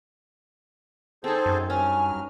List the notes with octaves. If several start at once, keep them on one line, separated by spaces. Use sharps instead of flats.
C4 D#4 G#4 A4 C5
F#2
G2 F#3 C#4 G#5 F6